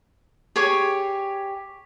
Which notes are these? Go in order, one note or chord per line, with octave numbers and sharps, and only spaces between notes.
G4 G#4 C#5